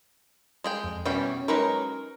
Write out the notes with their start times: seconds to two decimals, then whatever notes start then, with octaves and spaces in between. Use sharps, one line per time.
0.64 G#3 G#4 G5
0.84 F2
1.06 B2 E3 G3 C#4 G5
1.48 F#3 G#3 D#4 A#4 B4